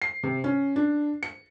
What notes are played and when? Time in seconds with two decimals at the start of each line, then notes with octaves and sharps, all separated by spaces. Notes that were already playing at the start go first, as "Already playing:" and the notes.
0.02 C7
0.23 C3
0.44 C#4
0.76 D4
1.23 C#7